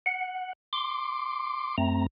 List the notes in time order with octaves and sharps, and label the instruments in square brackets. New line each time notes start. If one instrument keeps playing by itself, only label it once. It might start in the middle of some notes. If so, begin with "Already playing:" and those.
[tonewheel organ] F#5
C6 D6
F#2 A3 C4 A#5